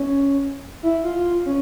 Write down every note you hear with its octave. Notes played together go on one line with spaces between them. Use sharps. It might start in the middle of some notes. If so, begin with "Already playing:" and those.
Already playing: C#4
E4
F4
C#4